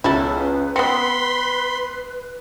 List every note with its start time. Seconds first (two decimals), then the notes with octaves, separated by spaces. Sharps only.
0.04 C#2 B3 C#4 E4 A4 B4
0.76 B3 C4 B5 C6 C#7